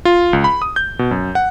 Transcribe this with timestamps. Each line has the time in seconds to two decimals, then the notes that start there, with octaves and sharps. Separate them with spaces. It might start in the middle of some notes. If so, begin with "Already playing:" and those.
0.05 F4
0.33 C#2
0.44 B5
0.62 D#6
0.76 G6
0.99 B2
1.11 F#2
1.35 F#5